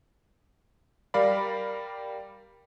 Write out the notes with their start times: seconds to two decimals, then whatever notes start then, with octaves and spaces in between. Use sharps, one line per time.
1.14 G3 A#4 D5 F5 B5